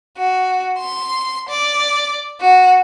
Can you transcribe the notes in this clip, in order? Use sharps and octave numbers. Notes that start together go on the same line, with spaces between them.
F#4
C6
D5
F#4